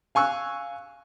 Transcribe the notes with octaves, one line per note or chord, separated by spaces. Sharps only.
F5 G#5 C#6 E6 F#6